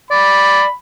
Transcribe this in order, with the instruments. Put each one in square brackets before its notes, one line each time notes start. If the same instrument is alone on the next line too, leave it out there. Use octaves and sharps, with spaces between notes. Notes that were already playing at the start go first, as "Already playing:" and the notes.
[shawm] D5 [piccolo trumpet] B5